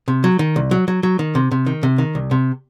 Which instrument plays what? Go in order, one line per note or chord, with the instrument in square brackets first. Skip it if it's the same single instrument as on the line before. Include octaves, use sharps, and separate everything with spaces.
[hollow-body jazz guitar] C3
F#3
D#3
C2
F#3
F#3
F#3
D#3
C3
C3
D#3
C3
D#3
C2
C3